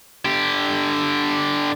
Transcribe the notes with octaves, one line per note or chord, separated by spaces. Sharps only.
D3 G4